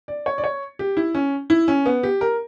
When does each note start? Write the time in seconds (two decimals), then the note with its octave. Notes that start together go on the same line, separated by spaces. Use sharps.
0.08 D5
0.26 C#5
0.38 D5
0.44 C#5
0.79 G4
0.97 E4
1.15 C#4
1.50 E4
1.68 C#4
1.86 B3
2.03 G4
2.21 A#4